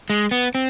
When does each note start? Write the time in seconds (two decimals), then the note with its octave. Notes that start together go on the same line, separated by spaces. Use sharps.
0.10 G#3
0.31 B3
0.55 C4